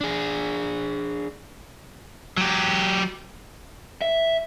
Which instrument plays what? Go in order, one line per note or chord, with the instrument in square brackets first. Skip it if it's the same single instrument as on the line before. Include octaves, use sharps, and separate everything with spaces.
[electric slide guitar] D4 G#4
[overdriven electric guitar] F#3 G4
E5